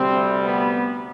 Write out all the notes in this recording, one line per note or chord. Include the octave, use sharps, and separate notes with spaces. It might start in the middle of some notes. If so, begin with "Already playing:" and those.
Already playing: D2 C3 G3 C4
B3